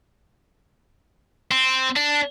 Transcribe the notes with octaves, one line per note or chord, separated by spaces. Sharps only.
C4
D4